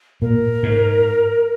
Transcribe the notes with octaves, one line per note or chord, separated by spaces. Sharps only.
A#2 A#4
G#2